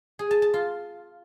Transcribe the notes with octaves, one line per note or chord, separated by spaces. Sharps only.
G#4
A5
A5
F4